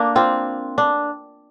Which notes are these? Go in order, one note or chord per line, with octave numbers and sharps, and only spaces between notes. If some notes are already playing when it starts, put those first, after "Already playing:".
Already playing: A#3 D4
C4 F4
D4